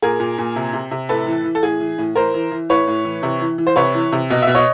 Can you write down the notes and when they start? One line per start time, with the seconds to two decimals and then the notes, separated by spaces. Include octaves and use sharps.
0.02 A#2 G#4 A#4
0.20 A#2
0.38 A#2
0.56 C3
0.73 C3
0.91 C3
1.09 A2 A4 B4
1.27 E3
1.44 E3
1.55 A4
1.63 A2 G#4
1.80 E3
1.98 A2
2.16 E3 A#4 C5
2.34 E3
2.52 E3
2.69 A2 B4 C#5
2.88 A2
3.05 E3
3.23 C3
3.41 E3
3.58 E3
3.67 C5
3.76 C3 B4 C#5
3.94 E3
4.12 C3
4.30 B2 D#5
4.42 B2 E5
4.55 C#5 D#5